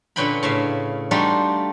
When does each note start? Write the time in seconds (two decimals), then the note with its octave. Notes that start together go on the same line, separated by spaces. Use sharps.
0.16 A#2 D3 C#4 B4 G5 B5
0.43 A2 C#3 E5 F5
1.11 G3 A3 D4 D#4 F4 F#4